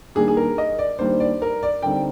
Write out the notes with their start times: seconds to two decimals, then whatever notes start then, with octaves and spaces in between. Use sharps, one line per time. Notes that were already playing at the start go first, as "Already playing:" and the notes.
0.15 D#3 G3 A#3 D4 G#4
0.28 G#4
0.37 A#4
0.58 D#5
0.79 D5
0.99 D#3 G3 A#3 D4 C5
1.20 D5
1.42 A#4
1.63 D5
1.82 D3 G3 C4 D#4 G5